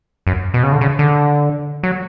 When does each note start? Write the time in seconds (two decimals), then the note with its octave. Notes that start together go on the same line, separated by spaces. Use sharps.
0.27 F#2
0.54 B2
0.63 C#3
0.72 D3
0.81 C#3
0.99 D3
1.83 F#3